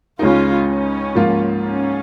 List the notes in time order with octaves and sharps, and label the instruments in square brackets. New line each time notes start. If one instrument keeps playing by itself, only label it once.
[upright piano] C#2 C#3 G#3 D#4 [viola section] C#4 F4
[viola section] C#4
[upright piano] G#2 F3 A#3 F4
[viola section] C#4